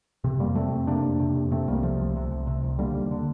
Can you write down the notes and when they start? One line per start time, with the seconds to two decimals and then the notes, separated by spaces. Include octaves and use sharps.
0.24 C3
0.39 F2 G3 A#3
0.55 C3 A3 C4
0.72 F2
0.87 C3 A#3 D4
1.03 F2
1.20 C3
1.35 F2
1.51 C3 A3 C4
1.67 C2 G3 A#3
1.83 C3 F3 A3
1.99 C2
2.16 C3
2.31 C2
2.47 C3
2.64 C2
2.79 D3 G3 A#3
2.95 D#2
3.11 D3